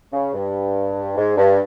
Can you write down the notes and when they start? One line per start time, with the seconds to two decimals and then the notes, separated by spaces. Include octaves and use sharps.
0.12 C#3
0.34 G2
1.17 G#2
1.37 G2